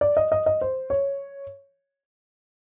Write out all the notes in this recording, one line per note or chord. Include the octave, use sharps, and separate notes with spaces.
D5
D#5
D#5
D#5
C5
C#5